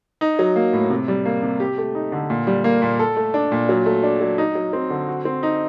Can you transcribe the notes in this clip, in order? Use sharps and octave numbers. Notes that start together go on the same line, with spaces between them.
D#4
F#3
A#3
A2
C3
G3
A#3
C3
G4
A3
D#4
D3
A#2
G3
A#3
A#2
A4
A3
D4
A#2
F#3
A3
D4
F#3
D#4
F#3
C4
D3
F#4
C4
D#4